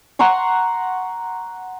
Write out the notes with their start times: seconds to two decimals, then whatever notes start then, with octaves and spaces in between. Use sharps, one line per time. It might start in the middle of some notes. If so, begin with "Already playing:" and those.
0.19 F#5 A#5 C6 C#6